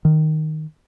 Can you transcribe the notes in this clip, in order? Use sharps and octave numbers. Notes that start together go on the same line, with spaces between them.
D#3